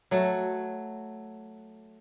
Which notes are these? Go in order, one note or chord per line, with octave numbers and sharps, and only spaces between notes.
F#3 A3